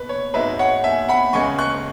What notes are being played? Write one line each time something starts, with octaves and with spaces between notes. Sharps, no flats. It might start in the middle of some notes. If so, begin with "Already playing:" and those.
Already playing: B2 B4
C#5
G#1 G#2 G#3 B4 E5
C#5 F#5
E5 G#5
F#5 B5
C#2 C#3 G#3 G#5 C#6
C#6 F#6